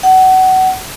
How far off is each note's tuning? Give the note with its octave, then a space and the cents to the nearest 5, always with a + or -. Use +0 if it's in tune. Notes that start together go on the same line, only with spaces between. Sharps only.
F#5 +25